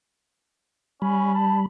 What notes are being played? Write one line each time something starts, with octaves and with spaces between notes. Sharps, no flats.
G3 C#4 B5
A5